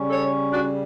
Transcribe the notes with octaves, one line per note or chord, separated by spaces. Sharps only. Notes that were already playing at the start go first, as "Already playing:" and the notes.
Already playing: C#3 G3 C#4
A4 C#5
D4 F#4